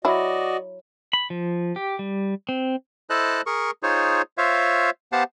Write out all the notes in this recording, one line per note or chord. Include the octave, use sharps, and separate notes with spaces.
F#3 E4 F#4 D5 D#5
B5
F3
G4
G3
C4
E4 A4 C5 D#5 A5 F#6
G#4 A#4 C#6
D#4 F4 G#4 C5 C#5
F4 C5 C#5 E5 F5
B3 G4 C5 F5 F#5 A5